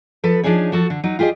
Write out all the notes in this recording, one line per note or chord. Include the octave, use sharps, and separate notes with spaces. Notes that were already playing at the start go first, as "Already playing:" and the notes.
F3 A4 B4
F3 D4 D#4 G#4 C#5
F3 F#4 A4
D3
F#3 D#4
F4 G4 G#4 C5 D#5